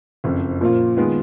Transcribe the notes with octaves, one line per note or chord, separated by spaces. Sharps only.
F#1 F2 F3
A#2 F3 A#3 F4
D#3 G#3 B3 F4